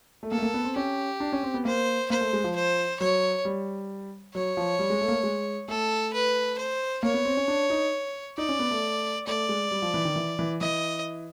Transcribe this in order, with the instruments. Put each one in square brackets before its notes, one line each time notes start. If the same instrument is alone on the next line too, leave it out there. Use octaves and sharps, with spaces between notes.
[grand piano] A3
[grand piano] A#3 [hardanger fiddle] A4
[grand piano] A3
A#3
B3
C4
[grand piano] C#4 [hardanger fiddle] G4
[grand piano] D4
C#4
C4
B3
[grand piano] A#3 [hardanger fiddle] C5
[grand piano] A#3 [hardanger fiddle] C5
[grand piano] A3
G#3
F3
[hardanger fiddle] C5
[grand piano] F#3 [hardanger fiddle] C#5
[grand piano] G3
[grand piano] F#3 [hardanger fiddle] C#5
[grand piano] F3
G3
G#3
A3
A#3
A3
G#3
[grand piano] A3 [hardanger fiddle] A4
[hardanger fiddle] B4
C5
[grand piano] A#3 [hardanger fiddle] C#5
[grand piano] B3
C4
C#4
D4
D#4
[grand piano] D#4 [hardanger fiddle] D5
[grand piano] C#4
B3
A3
[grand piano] A3 [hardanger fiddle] D5
[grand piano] G#3
G3
F3
E3
D#3
E3
E3
[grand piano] E3 [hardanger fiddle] D#5